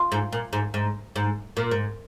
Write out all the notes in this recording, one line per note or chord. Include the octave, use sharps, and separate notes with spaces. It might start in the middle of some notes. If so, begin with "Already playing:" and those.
Already playing: F4
G#2
A#2
G#2
G#2
G#2
A#2
G#2